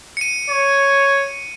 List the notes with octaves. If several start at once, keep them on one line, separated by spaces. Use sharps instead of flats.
C#7 D#7
C#5